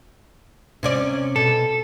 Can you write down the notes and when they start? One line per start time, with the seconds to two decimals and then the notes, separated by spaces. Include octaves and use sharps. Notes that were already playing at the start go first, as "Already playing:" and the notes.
0.83 C3 C#4 D5
1.36 B2 A4